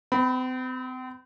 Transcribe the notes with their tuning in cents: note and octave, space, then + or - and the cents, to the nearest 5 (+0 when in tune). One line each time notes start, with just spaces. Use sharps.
C4 -40 B5 +15